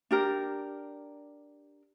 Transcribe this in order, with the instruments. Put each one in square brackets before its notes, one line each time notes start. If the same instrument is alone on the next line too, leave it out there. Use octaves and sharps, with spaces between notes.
[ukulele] D4 G4 A#4